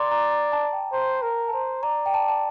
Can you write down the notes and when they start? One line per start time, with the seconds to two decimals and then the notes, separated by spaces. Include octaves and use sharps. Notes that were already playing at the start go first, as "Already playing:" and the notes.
Already playing: D5 A#5 C6
0.11 A#5
0.31 A#5
0.52 A5
0.73 G5
0.92 C5 A#5
1.22 A#4 A#5
1.48 A5
1.53 C5 A#5
1.83 D5 A#5
2.06 G5
2.14 A5
2.28 A5